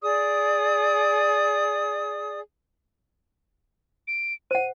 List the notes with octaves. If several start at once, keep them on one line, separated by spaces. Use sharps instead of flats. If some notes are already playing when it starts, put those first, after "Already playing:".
G#4 D5 D#6
D7
C5 F#5 D#7